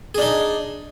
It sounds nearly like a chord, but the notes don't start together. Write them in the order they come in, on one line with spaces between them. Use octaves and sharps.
G#4 D4 D#4